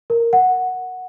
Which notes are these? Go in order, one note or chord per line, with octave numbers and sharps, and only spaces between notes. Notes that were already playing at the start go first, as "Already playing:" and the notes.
A#4
F#5